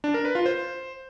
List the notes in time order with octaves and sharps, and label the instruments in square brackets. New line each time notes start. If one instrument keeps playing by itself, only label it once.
[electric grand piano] D4
A#4
B4
F4
C5